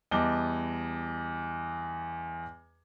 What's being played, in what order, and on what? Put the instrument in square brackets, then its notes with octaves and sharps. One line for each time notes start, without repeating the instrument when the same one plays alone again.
[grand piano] E2 G3 D#5 A5 D6 G7